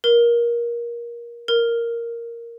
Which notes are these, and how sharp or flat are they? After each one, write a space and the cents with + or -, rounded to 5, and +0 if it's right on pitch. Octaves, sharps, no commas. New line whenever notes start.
A#4 +20
A#4 +0